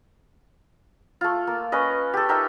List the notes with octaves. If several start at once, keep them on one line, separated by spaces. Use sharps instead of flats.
A3 F4
A#3
C#4 B4 D#5
G4 A4
D#4 A#4 E5 G5